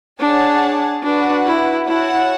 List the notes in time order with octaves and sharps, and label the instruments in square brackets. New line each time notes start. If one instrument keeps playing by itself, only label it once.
[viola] D4 [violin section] G#4 C#5 F#5 A5
[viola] D4 [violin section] F#4 B4 F#5
[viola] E4
[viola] E4 [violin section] F#4 C#5 F#5 A5